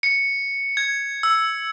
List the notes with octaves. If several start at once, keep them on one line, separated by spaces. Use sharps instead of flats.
C#7
G#6
E6